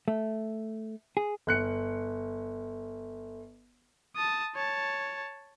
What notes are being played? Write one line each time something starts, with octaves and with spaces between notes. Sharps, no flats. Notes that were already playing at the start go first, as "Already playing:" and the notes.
A3
G#4
G1 F#6 C#7
A5 D#6
C#5 A5